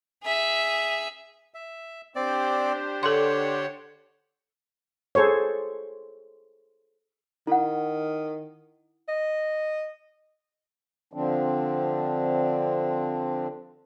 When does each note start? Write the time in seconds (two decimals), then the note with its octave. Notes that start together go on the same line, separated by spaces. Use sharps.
0.23 G#4 E5
1.54 E5
2.16 C4 D4 G4 C5 D5
3.03 D3 A4 C#5 F#5 C6
5.15 G#4 A4 C5 C#5
7.47 D#3 E4 F#5
9.08 D#5
11.13 D3 F3 C4 D4